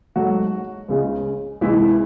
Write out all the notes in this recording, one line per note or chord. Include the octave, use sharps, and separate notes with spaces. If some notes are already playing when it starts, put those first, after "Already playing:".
G#2 F#3 A3 F#4
C#2 C#3 G#3
C#2 C3 E3 G#3 E4